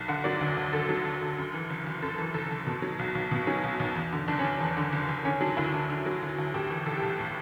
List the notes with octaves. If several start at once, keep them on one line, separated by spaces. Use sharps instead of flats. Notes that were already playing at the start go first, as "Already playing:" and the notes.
Already playing: B1
D3 F#5
F#3 D5
D2
D2
D3 A4
F#3
D2
D2
F#2
E3
F#1
F#1
F#2 A4
E3
F#1 A4
F#1
B2
F#3
B1
B1
B2
F#3 C#4
B1
B1
E2
D3
F#1 D4
C#4
F#1
E2
D3
F#1
F#1
D3 C#4
F#3 D4
D2 E4
D2
D3
F#3
D2
D2
A2 G4
E3
B1 A4
G4
B1
A2